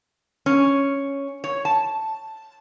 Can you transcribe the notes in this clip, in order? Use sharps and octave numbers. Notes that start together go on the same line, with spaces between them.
C#4
C#5
A5